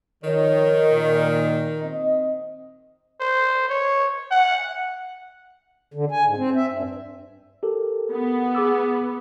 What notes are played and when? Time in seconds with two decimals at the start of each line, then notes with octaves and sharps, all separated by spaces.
0.23 D#3 F3 C#5
0.92 A#2
1.82 C4 D#5
3.21 C5
3.69 C#5
4.31 F#5
5.94 D3
6.11 G#5
6.26 G#2
6.38 C4
6.56 E5
6.72 G2
7.63 G4 A4 A#4
8.11 B3
8.55 G#4 D6 E6